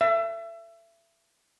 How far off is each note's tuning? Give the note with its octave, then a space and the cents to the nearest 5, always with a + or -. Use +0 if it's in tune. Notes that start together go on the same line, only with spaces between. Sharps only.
E5 +30